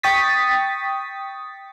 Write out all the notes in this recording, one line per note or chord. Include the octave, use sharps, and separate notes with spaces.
G5 C#6 D#6 A6 B6